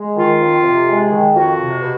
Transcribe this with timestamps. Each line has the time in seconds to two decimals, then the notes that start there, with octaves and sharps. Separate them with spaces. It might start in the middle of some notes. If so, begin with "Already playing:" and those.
Already playing: G#3
0.16 D#3 F4
0.39 F2
0.64 C3
0.87 G#3
1.10 D#3
1.34 F2 F#4
1.58 C3
1.82 B2